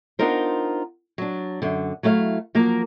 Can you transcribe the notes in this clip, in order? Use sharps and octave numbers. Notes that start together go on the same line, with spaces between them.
B3 D4 D#4 F4 A#4 C5
F#3 D4
F#2 D3
F#3 A3 E4 E5 F5
F3 F#3 A#3 A#4